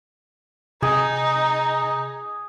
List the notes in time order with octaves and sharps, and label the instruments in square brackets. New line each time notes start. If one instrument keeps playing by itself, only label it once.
[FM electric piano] C3 [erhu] D#4 [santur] G#4